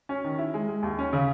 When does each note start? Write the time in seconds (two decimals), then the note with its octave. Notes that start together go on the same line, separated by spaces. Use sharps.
0.09 C#4
0.24 D#3
0.39 E4
0.54 G#3
0.68 G#3
0.83 D#2
0.99 C#4
1.13 C#3